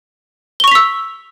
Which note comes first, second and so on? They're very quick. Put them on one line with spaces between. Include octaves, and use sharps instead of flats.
G7 C#6 F7 B6 E6